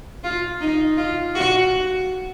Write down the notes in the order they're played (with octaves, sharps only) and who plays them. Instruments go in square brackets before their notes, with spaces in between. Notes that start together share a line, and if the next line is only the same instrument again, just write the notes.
[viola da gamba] F4
D#4
F4
F#4